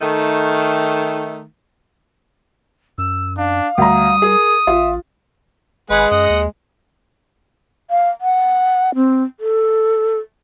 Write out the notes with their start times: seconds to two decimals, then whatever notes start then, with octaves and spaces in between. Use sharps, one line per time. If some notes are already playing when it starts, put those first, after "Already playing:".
0.01 D#3 A3
2.98 F#2 E6
3.38 D4 F5
3.78 D2 G3 A#5 D#6
4.22 G#4 A#4
4.67 A1 F4 E5
5.90 G#1 G#3 G#4 B4 F#5
6.11 F#2 D#5 F#5
6.30 D#2
7.90 F5
8.21 F#5
8.95 C4
9.40 A4